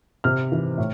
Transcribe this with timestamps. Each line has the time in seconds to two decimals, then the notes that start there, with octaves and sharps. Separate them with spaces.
0.24 C3 F6
0.52 E3
0.78 A2